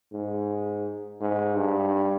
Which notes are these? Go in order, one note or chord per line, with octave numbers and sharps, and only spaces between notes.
G#2
G#2
G2